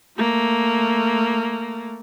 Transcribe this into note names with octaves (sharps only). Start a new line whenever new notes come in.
A3 A#3